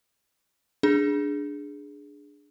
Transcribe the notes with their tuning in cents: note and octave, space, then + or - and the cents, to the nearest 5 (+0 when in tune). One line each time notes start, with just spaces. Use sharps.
D4 +0 G#4 +0